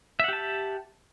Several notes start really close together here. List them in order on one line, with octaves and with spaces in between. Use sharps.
E5 F#5 G4 A5